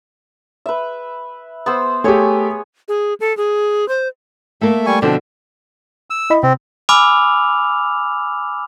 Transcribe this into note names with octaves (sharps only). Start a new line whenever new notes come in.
B4 E5
B3 C5 E6
A3 G4 G#4 C#5 G#5
G#4
A4
G#4
C5
A3 A#3 A4 E5
G3 G#5 C#6
B2 D3 F3 C4 D4 D5
E6
E4 D#5 B5
C3 C4
G#5 B5 D6 E6 F6 F7